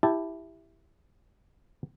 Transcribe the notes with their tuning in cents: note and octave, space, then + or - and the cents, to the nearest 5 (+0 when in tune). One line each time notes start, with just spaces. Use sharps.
E4 +0 G4 +0 A5 +0